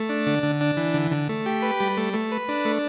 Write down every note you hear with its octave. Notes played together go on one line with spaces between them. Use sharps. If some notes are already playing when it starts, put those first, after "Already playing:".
Already playing: A3
D4
D3
D3
D4
E3
D3
D3
A3
G4
B4
G3
A3
A3
B4
D4
A3